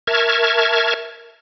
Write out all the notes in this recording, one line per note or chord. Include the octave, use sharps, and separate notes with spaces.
A#4 E5 A5 C#6 F6 G#6